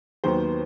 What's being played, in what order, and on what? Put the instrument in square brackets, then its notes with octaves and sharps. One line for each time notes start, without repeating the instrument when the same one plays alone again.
[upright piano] D#2 D#3 F#3 B3 C5